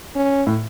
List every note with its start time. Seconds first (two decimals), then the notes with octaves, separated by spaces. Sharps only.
0.15 C#4
0.47 A2